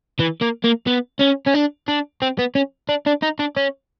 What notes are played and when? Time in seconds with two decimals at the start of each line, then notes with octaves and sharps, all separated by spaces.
0.20 E3
0.42 A#3
0.64 A#3
0.87 B3
1.21 C#4
1.47 C#4
1.55 D4
1.88 D4
2.22 C4
2.39 B3
2.55 C#4
2.89 D4
3.07 D4
3.23 D#4
3.39 D4
3.56 C#4